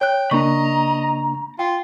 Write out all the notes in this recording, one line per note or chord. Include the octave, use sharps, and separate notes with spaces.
C#5 G5 F#6
C#3 A#3 D4 D#5 A#5 B5 C#6
F4 G5